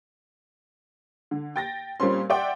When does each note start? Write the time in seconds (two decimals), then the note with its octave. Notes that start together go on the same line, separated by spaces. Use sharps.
1.31 D3
1.56 G5 A6 A#6
2.00 A#2 G3 C4 C#4 C6
2.30 D5 E5 F#5 G5 C6 D6